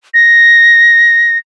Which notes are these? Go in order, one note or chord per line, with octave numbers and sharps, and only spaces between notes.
A#6